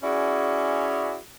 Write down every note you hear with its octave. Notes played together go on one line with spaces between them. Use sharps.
C#4 E4 F#4 G#4 D5